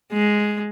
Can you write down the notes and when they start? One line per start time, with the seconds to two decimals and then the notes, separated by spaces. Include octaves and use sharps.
0.12 G#3